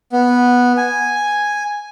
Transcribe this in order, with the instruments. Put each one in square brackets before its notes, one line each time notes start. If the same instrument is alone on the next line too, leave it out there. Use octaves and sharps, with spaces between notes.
[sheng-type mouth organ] B3
G#5